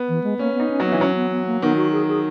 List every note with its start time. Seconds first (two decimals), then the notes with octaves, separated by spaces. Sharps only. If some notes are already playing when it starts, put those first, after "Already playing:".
Already playing: B3
0.09 E3
0.24 G#3
0.39 A#3 C#4
0.55 B3 D#4
0.70 C#4
0.80 F#3
0.85 B3
0.91 E3
1.00 F#3 C#4
1.16 B3
1.31 B3
1.47 A#3
1.62 D#3 B3
1.77 F#4
1.92 G#4
2.08 G#4